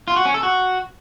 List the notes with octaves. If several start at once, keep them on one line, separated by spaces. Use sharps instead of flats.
F4
F#4
C#4
A4
F#4